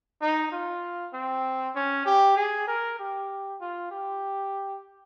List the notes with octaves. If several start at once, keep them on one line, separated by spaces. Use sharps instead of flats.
D#4
F4
C4
C#4
G4
G#4
A#4
G4
F4
G4